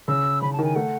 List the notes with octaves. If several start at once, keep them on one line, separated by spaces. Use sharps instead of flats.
C#3 E6
C#3 B5
A5
D#3
G#5
A3 F#5